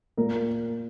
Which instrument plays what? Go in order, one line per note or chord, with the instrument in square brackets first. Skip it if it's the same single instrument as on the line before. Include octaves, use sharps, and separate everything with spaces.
[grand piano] A#2 A#4